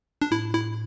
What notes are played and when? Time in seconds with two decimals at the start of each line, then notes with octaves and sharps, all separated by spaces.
0.22 D4
0.31 A2 E4
0.54 E4